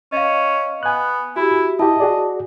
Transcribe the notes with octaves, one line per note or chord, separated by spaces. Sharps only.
C#4 D#5 F5
B3 G#5 F#6
E4 F#4 G4
E4 G4 D#5 A5
F#4 G#4 D5